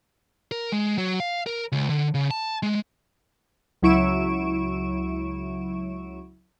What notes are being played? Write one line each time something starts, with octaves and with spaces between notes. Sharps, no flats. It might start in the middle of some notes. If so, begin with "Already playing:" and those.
A#4
G#3
F#3
F5
A#4
C#2
D3
C#3
A5
G#3
C#2 F#3 E4 C#6 D7 E7